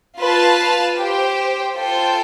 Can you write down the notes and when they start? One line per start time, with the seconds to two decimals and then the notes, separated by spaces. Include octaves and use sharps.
0.20 F4 B4 F5 A5
0.98 G4 C5 G5
1.77 F4 A4 C5 G5